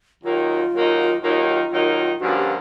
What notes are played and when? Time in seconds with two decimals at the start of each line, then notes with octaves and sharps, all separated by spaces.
0.24 D#2 D#3 F#3 A#3 D#4 F4
0.74 D#2 D#3 F#3 A#3 D#4
1.23 D#2 D#3 F#3 A#3 D#4 F4
1.71 D#2 D#3 F#3 A#3 D#4
2.20 G2 D3 F3 A#3 C#4 F#4
2.37 G4